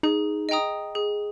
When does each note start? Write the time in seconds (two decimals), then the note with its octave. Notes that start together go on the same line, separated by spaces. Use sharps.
0.03 D#4 G#4
0.49 D#5 G5 A#5 D#6
0.95 G#4